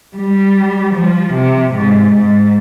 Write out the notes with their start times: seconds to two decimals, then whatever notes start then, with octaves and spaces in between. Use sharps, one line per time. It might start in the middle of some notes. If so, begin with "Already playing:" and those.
0.17 G3
0.96 F3
1.35 C3
1.74 G#2
2.13 G#2